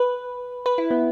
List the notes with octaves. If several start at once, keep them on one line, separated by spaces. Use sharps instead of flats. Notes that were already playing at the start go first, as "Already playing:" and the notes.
Already playing: B4
B4
E4
B3